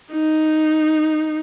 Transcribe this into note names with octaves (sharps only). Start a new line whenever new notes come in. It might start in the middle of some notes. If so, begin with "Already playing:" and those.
D#4